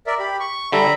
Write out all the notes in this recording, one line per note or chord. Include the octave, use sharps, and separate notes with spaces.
A#4 D5 E5
G4 B5
C#6
D3 G3 A4 E5 A#5 B5